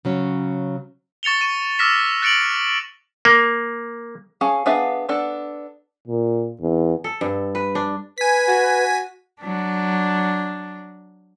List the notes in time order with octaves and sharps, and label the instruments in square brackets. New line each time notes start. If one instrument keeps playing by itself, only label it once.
[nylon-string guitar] C#3 F#3 C#4
[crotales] C#6 A6 C#7 F7 G7
C#6 D#7
D6 E6 F6 A#6 B6 E7
F#6 A6 C#7 D7 F7 F#7
[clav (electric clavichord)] A#3
[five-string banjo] C#4 G#4 F5 A5
B3 D4 G#4 E5 F5
B3 D4 A4
[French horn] A#2
E2
[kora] A4
G2
B4
D4
[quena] B4 [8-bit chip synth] G#5 B6
[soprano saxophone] F#4
[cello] F#3 D4